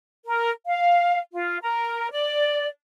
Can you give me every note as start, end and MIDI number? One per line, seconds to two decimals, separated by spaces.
0.26 0.50 70
0.67 1.19 77
1.32 1.57 65
1.62 2.10 70
2.11 2.67 74